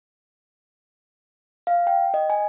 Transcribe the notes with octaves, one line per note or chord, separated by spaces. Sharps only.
F5
G5
D#5
G#5